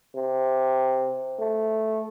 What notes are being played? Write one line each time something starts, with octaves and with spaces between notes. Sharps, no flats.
C3
A3